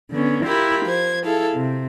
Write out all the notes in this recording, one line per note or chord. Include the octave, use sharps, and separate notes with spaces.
D3 B3 C#4
E4 F4 G4 A#4 B5
F3 C5 G#6
E4 G#4 A4 F5
C3